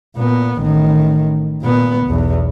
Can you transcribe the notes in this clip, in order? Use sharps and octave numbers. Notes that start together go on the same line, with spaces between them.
A#2 B3
A1 D#3
A#2 B3
B1 E2